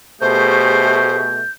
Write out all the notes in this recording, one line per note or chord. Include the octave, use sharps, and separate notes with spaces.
B2 A3 G4 G#4 C5 G6